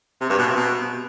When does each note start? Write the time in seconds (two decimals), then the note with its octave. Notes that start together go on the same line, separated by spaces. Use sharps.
0.21 C3
0.30 G2
0.39 B2
0.47 C3
0.56 B2